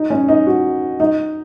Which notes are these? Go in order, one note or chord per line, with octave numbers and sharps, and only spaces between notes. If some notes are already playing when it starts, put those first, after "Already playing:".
Already playing: D#4
C#4
D#4
F#4
D#4